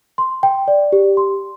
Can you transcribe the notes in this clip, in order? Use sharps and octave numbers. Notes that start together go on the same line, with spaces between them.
C6
G5
D5
G4
C6